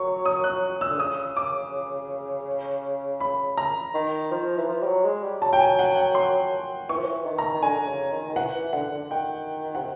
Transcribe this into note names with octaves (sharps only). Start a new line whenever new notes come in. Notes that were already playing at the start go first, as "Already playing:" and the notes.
Already playing: F#3 C#6
D#6
F#6
E6
D3
C#3 D#6
D6
B5
A#5
D#3
F3
E3
F3
G3
F#3
G#3
G3
F#3 A5
G5
G#5
F#5
G5
C6
E3 C#6
F3
E3
D#3
A#5
D#3
D3 G#5
D3
C#3
D#3
D#3
E3 F#5
E3
D3 F#5
D3
D#3 G5
C3 F#5